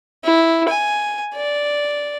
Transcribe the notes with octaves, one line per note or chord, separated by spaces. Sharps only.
E4
G#5
D5